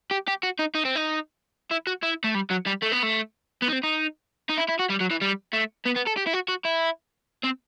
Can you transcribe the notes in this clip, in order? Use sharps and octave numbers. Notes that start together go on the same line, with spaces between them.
G4
G4
F#4
D#4
D#4
C4
D#4
E4
F#4
E4
A3
G3
F#3
G3
A3
B3
A3
B3
D#4
C4
D#4
D#4
E4
E4
F#4
G3
F#3
E3
G3
A3
B3
B3
A4
G4
E4
F#4
F#4
E4
C4